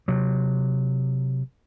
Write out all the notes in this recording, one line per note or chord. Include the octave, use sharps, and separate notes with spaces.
C3 F#3